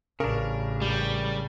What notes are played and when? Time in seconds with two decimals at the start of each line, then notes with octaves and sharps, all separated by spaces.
0.20 A1 C#3 D4 A#4
0.82 G3